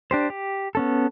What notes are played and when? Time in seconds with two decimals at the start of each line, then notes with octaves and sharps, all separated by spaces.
0.11 D4 G4 C5
0.30 G4
0.75 B3 C#4 A4